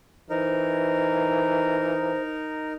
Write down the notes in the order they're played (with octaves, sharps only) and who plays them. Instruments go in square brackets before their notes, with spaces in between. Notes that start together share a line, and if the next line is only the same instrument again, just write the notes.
[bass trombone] E3 [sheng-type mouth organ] D#4 A#4 [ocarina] C5